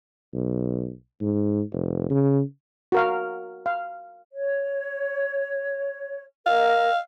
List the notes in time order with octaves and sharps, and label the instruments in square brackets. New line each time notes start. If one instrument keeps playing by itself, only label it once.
[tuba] B1
G#2
F1
C#3
[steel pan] F#4 A#4 F5
F5
[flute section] C#5
[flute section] A#4 D#5 [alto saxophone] F5